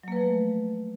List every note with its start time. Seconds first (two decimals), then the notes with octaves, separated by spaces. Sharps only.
0.03 F#3
0.08 A#3
0.12 B4
0.16 F3
0.21 A3